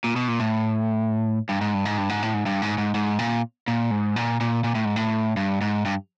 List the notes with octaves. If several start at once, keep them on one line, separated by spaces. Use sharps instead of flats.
A#2
B2
A#2
A2
G2
G#2
G2
G#2
G2
G#2
A2
G#2
G2
G#2
G#2
G#2
A#2
A#2
G#2
A#2
A#2
A#2
A2
G#2
A2
G2
G#2
G2